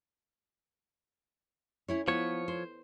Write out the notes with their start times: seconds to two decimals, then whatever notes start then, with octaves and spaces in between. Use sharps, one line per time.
1.88 C#4 E4 C#5
2.08 F3 B3 C#5
2.48 C5